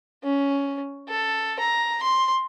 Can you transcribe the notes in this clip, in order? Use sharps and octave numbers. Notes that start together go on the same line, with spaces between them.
C#4
A4
A#5
C6